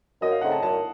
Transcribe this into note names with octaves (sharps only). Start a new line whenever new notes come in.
F#2 D#5
F5
C#3 A3 C4 D#4 F#5
A5
F#2 A5